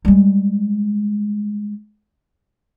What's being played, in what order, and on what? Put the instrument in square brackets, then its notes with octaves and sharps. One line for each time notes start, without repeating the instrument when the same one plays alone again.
[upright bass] G3 G#3